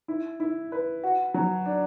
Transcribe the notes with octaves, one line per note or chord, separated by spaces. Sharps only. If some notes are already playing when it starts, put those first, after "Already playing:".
E4
E4
B4
F#4
F#3
D4